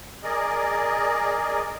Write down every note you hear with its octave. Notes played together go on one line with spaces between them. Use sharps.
G#4 A#4 D5 D#5